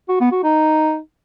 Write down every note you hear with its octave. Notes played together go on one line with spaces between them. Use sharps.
F#4
B3
F#4
D#4